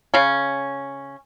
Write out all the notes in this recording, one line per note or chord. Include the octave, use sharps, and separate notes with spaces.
C#3 C#4